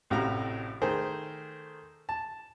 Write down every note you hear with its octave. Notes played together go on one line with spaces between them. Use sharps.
A1 A2 C3 F#4 F5 A#5
D#3 A3 G#4 A#4 C5
A5